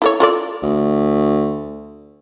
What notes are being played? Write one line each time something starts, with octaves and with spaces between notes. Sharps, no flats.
E4 A4 C#5
F4 A4 D5
D2